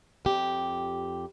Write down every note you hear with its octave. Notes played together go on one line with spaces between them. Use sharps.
F2 G4